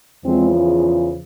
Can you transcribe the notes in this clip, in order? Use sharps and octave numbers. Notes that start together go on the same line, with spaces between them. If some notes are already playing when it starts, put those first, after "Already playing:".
E2 C#3 F3 G#3 C4